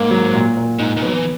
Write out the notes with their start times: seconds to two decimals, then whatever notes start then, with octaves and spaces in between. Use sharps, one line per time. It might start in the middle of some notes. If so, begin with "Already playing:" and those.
Already playing: G#2 A#3
0.11 F#3
0.33 A#2
0.57 A#2
0.79 G#2 D#4
0.97 A#2
1.02 F#3 B3
1.13 E3